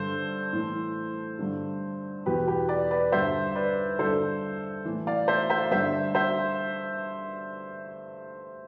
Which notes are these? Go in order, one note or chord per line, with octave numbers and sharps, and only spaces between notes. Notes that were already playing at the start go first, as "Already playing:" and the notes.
Already playing: G2 D3 A4 C5
A2 E3
G2 D3
E2 B2 G4 B4
G4 B4
B4 D5
B4 D5
G2 D3 C5 E5
B4 D5
G2 D3 A4 C5
A2 E3
D5 F5
C5 E5
C5 E5
G2 D3 C5 E5
C5 E5